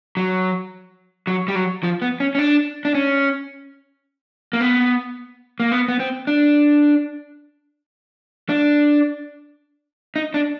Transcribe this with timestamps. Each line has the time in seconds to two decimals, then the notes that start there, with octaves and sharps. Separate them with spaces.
0.17 F#3
1.27 F#3
1.48 G3
1.55 F#3
1.83 F3
2.02 B3
2.20 C#4
2.35 C#4
2.39 D4
2.85 D4
2.95 C#4
4.53 A#3
4.61 B3
5.60 A#3
5.72 B3
5.88 B3
6.00 C4
6.27 D4
8.49 D4
10.16 D#4
10.34 D4